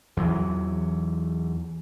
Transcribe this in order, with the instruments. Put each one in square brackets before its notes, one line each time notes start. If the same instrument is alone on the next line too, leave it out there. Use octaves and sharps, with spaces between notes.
[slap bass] E2 E3 F#3